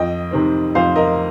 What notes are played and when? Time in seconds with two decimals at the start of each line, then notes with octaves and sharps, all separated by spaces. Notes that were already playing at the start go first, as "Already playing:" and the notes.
Already playing: F2 D#5 G5
0.31 C3 D#3 C4
0.75 F2 C5 F5
0.96 A#4 D#5